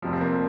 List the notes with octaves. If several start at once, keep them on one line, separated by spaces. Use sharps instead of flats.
F1 F2 C3 F3
C4
A#3